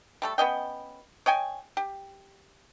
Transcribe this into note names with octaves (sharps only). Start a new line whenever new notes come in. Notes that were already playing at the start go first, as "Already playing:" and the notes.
G3 A3 A4
B3 C#4 D#5 G5
C#5 D#5 G5 G#5
G4